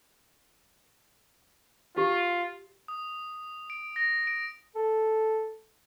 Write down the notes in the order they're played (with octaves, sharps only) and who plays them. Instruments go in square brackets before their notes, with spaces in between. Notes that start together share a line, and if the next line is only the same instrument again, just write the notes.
[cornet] F4 [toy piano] G4 F5
[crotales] D#6
D7
A#6
D7
[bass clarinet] A4